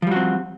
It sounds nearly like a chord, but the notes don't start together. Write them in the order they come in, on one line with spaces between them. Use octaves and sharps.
F3 G3 F#4 C4